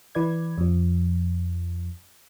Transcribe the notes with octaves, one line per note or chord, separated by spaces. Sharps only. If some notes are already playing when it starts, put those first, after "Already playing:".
E3 B4 D5 G#6
F2 F3